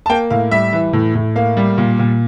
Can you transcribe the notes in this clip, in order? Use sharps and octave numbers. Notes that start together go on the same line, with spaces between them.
A5
A#3 G5
A2 F5
G3 E5
E3
A2
A2
A#3 F5
G3
A#2
A#2